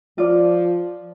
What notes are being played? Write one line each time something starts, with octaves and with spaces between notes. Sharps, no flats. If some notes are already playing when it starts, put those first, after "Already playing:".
F3 F4 D5